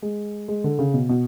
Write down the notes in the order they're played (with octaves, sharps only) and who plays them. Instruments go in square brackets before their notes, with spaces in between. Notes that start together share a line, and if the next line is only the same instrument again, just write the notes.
[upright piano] G#3
G#3
D3
C#3
B2
B2